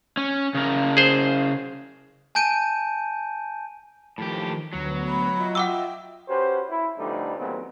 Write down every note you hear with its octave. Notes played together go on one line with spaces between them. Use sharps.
C#4
C#3 A#4
G#4 C5
G#5 A5 G6 D7 D#7
A2 D#3 F3 G4
D2 F#3 B3
B5
F4 D#5 E5
F#5 G5 D6 E6
C#4 F#4 G4 B4 C5
E4
F2 D3 E3 G3 A3 D#4
D#2 A2 C#3 F#3 B3 C4